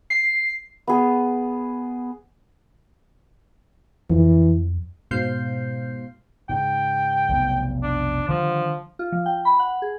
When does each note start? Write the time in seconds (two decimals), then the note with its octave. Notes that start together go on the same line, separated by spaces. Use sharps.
0.10 C7
0.87 B3 G#4
4.10 F2 E3
5.11 G#2 B2 C5 F5 G6 C7
6.49 G#2 C#3 G5
7.29 F1 B1 G3
7.83 D4
8.29 D3 D#3 F3 G3
8.99 F4
9.12 F3
9.26 G5
9.45 B5
9.59 F#5
9.82 G#4